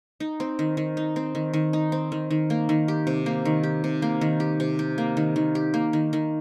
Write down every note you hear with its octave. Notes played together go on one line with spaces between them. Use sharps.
D#4
C4
D#3
D#3
D#4
C4
D#3
D#3
D#4
C4
D#3
D#3
A#3
D#3
G4
C3
A#3
D#3
G4
C3
A#3
D#3
G4
C3
G4
A#3
D#3
D#3
G4
A#3
D#3
D#3